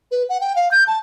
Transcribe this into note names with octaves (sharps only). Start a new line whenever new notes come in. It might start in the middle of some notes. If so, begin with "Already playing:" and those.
B4
F#5
G5
F5
G6
A5